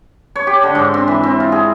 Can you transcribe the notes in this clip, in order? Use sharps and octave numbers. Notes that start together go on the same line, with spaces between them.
C#5
G4
D3
G#2
C4
E3
C4
F4
G#4